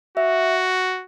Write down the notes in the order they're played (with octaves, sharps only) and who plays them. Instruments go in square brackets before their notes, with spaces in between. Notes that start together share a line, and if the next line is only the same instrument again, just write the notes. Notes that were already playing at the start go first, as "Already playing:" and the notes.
[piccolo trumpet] F#4 [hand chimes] E5